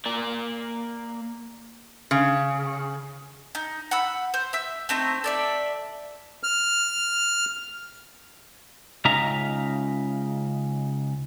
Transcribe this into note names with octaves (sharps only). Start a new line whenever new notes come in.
A#3 D5
C#3
D#4
F#5 B5 E6
C5
E5 E6
A3 C4 D#4 A#5
A4 D5 E5
F6
C#2 C#3 D#4 E5 F5 A#5